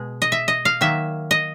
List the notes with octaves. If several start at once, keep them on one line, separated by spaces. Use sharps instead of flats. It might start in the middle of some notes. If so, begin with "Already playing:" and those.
Already playing: B2 G#3
D#5
E5
D#5
F5
D#3 F#3 A#3 E5
D#5